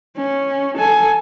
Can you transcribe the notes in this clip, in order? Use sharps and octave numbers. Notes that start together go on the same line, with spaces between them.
C#4
A4 G#5